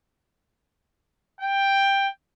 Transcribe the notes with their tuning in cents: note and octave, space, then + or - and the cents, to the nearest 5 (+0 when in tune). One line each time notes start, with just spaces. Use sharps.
G5 +10